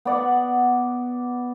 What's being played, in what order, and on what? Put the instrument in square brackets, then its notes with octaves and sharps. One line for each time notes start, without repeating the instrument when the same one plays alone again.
[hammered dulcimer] B3 D5 F#5